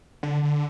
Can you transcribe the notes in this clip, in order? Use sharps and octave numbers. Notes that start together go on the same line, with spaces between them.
D3
D3